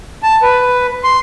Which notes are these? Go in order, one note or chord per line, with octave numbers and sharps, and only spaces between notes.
A5
B4
C6